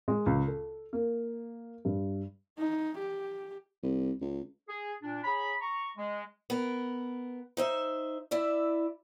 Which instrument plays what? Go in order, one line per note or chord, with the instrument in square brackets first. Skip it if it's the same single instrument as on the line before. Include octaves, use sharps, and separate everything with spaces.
[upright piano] G#3
C#2
A4
A#3
G2
[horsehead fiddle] D#4
G4
[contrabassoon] C2
C#2
[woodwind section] G#4
A#2 D4
G#4 C#5 A#5 B5
A#5 C#6
G#3
[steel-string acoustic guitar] B3 A#4
D#4 C5 E5
E4 D5 E5